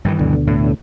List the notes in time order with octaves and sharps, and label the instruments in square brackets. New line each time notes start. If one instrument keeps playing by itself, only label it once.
[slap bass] G2 D#3 E3
[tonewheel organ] D2 B2 D3
[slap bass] A2